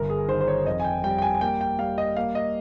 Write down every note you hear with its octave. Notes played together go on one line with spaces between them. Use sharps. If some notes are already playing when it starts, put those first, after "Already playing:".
Already playing: G1 A#4
G#4
D#3 C5
C5
C#5
F2 D#5
G#5
G5
G3 G5
G5
G#5
G#5
A#3 G5
G5
G3 F5
D#5
A#3 F5
D#5